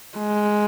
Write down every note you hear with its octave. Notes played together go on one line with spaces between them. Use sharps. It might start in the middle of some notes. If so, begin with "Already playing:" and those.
G#3